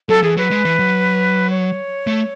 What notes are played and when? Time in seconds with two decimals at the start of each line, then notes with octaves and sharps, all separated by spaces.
0.09 F#3 A4
0.23 E3 G#4
0.37 F#3 B4
0.51 G#3
0.65 E3
0.79 F#3
1.50 C#5
2.07 A3